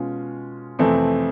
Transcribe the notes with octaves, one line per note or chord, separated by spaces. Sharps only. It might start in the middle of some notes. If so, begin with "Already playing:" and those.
Already playing: B2 G#3 C#4 F4
F2 C3 E3 A3 C4